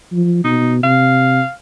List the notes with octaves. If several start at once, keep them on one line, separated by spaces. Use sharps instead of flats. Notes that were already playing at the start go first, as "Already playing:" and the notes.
F3
B2 D#4
C3 F5